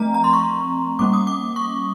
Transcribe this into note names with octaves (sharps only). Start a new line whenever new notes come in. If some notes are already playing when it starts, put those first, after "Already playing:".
Already playing: F3 A3 C4 A#5
A#5
C6
C#6
G3 A#3 C#4 D6
D#6
D6
C#6